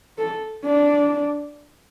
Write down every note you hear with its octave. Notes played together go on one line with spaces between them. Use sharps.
A4
D4